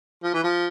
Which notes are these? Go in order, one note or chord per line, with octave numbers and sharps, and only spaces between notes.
F3
E3
F3